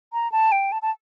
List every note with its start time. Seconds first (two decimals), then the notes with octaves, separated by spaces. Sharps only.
0.13 A#5
0.32 A5
0.52 G5
0.72 A5
0.82 A5